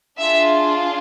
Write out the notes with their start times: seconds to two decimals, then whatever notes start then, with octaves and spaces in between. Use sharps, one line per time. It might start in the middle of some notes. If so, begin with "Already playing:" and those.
0.18 D4 F4 G#4 E5